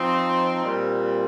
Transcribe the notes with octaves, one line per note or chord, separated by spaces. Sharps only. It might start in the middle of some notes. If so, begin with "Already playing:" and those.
Already playing: F3 C4 D#4
A#2 G3 C4